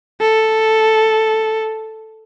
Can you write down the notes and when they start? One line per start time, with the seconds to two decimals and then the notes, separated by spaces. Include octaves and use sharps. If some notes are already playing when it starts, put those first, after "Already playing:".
0.21 A4